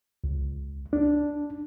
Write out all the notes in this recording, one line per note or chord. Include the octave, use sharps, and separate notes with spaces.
C#2
D4